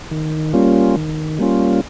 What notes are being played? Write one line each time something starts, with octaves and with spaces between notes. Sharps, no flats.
D#3
G3 A#3 C#4 F4
D#3
G3 A#3 C#4 F4